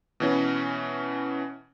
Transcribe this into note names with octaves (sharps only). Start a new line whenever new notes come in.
B2 E3 C#4